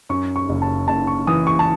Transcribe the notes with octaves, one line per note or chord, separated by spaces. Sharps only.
F#2 C#6
C#6
F#1
A5
F#1 A5
C#6
E3 D#6
C#6
A5